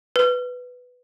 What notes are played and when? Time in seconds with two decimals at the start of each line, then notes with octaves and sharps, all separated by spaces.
0.16 B4